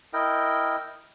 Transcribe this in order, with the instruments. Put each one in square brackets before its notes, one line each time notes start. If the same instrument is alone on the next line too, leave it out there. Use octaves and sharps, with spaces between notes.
[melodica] E4 A#4 D#5 G5